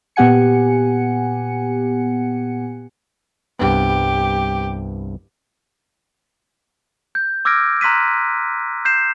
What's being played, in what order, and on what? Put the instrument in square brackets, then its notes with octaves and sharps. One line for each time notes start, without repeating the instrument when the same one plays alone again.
[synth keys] A#2 B3 G4 F#5 G#5 C#7
[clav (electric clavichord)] C2 G2 B3 [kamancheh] G4
[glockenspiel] G6
D6 E6 F6 G#6 A#6 D7
A#5 C6 F#6 B6 D#7
G6 C7 E7